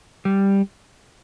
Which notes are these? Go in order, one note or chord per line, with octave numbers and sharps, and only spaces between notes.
G3